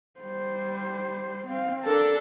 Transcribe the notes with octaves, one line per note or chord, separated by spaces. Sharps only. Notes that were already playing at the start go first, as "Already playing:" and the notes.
G3 C5
C4 F5
D4 A4 A#4 A5